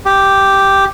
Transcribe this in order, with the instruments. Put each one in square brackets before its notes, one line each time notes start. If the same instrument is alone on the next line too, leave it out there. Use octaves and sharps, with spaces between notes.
[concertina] G4